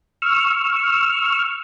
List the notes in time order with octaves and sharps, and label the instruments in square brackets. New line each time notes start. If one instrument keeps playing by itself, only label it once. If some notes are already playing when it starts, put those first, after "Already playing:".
[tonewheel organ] C#6 E6 F6